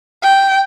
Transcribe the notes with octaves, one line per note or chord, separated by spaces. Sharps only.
G5